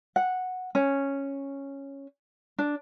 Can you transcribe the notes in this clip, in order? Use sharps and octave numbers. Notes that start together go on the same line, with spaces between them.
F#5
C#4
D4